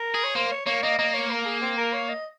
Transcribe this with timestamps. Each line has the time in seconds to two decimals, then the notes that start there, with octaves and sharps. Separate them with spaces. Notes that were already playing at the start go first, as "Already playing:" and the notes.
Already playing: A#4
0.15 G#4
0.24 C#5
0.35 A#3 C5
0.51 C#5
0.66 A#3 C#5
0.83 A#3 D#5
0.98 A#3 D#5
1.14 C#5
1.31 A#4
1.46 G#4
1.61 C4
1.77 A#4
1.93 C#5
2.09 D#5